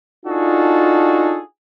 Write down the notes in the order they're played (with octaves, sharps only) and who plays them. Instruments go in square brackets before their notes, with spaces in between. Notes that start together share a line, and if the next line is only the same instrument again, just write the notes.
[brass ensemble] D4 D#4 F4 F#4 G#4 A4